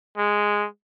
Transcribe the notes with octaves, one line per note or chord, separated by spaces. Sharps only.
G#3